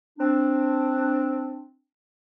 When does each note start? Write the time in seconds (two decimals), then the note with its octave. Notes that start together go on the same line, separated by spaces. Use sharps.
0.18 C4 D4